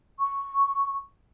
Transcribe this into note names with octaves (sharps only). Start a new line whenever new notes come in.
C#6